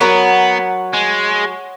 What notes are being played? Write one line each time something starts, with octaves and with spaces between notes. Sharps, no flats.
F#3 B3 A#4 C#5 F#5
G#3